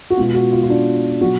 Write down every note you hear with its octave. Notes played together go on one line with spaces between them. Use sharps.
F#4
B2 G#3 B3 F4
F#4
F4
F4
D4
B2 F#3 F#4